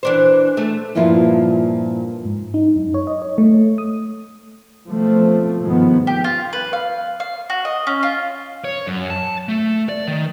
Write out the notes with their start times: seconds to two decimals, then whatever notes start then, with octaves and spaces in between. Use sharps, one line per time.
0.03 E3 D4 C5
0.57 A3
0.95 G2 A#2 F3 E4 F4
2.25 G#2
2.54 D#4
2.76 F#2
2.94 C#5
3.07 D#5
3.22 C#5
3.38 A3
3.78 D#6
4.88 B2 F3 A3 C4
5.61 G#1 G2 D#3 F3 G#3 B3
6.07 G4
6.24 F4
6.53 B4
6.73 F5
7.20 F5
7.50 F#4
7.65 D#5
7.87 C#4
8.03 F4
8.65 C#5
8.87 F#2
9.10 A5
9.48 A3
9.89 D5
10.07 D#3